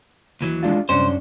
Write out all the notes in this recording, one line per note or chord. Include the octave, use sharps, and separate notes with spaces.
D#2 E3 F#3
G#3 D4 F4
C2 F#2 C#4 D4 C5